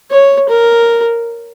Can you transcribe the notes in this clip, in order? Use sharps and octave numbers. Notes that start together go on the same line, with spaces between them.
C#5
A#4